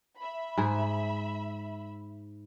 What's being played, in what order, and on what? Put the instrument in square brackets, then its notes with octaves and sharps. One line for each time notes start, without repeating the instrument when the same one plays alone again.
[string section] E5 B5
[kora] G#2 G#4